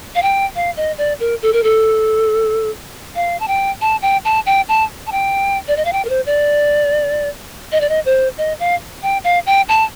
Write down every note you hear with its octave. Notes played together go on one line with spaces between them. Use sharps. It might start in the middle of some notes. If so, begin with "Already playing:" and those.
F5
G5
F5
D#5
D5
A#4
A4
A#4
A4
F5
A5
G5
A5
G5
A5
G5
A5
A5
G5
D5
D#5
F5
G5
A#4
C5
D5
D#5
D5
D#5
C5
D#5
F5
G5
F5
G5
A5